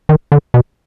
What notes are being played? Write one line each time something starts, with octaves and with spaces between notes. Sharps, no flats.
D#3
D3
B2